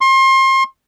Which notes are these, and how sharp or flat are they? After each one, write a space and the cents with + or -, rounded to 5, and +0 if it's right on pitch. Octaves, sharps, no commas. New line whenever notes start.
C6 +35